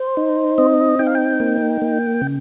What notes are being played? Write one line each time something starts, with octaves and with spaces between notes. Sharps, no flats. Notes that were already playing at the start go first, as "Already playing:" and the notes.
Already playing: C5
D#4
C4 D#5
D#4 G5
F5
G5
A#3
A#3
C#3